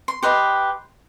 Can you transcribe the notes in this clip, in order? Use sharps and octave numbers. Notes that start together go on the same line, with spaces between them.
C6
G4 B4 D#5 C6